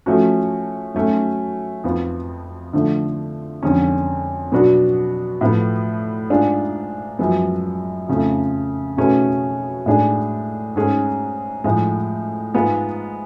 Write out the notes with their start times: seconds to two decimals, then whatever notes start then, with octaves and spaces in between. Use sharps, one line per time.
0.06 F3 A3 C#4 F#4
0.95 F#3 A3 C#4 F#4
1.84 F2 F3 B3 F4
2.73 D3 F3 A3
3.63 F2 D3 G#3 C#4
4.52 B2 F#3 B3 D4 F#4
5.41 A2 F3 B3
6.30 G#2 G#3 D4 F4
7.19 F#2 F3 G#3 B3
8.08 F2 C#3 F3 A3
8.97 B2 A3 C#4 G#4 B4
9.86 A2 G#3 D4 G#4
10.76 G#2 G#3 C#4 G#4
11.64 A2 F3 G#3
12.54 G#2 G#3 B3 F4